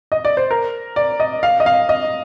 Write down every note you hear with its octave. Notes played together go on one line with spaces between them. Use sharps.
D#5
D5
C5
A#4
D5
D#5
F5
D#5
F5
D#5